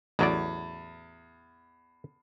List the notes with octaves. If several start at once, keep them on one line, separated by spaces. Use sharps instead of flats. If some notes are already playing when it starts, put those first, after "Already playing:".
A1 E2 F#3 D5